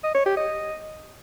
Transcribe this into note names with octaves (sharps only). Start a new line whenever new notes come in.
D#5
C#5
G4
D#5